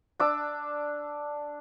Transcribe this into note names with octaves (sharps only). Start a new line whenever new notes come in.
D4 D6 E6